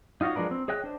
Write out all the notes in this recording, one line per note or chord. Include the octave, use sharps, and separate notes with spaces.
D#4 F4 F#4 C#5 D#5
F3 G#3 D4 A#4 B4
C4
G#4 C#5 D#5 G5 F#6
D4 C5